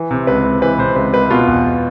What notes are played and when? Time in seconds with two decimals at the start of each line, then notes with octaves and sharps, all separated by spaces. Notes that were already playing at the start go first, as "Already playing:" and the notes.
Already playing: E3
0.11 C3
0.27 C#2 B4
0.45 C#2
0.62 E3 B4
0.78 C3 C5
0.96 C#2 B4
1.13 C#2 B4
1.30 B2 F4
1.47 E2